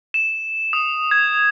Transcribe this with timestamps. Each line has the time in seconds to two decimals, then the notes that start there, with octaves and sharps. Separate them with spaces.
0.14 E7
0.73 D#6
1.11 G#6